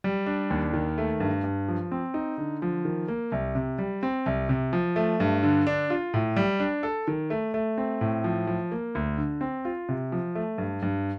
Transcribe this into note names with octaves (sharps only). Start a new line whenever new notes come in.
G3
D4
D#2
D#3
A3
G2
G2
F3
C4
D#4
D3
F3
D#3
A#3
C2
C3
G3
C4
C2
C3
F3
A3
G2
D3
D4
F4
A2
G3
D4
A4
D#3
A3
A3
C4
A2
F3
F3
A#3
D2
D3
C4
F4
C3
F3
A3
G2
G2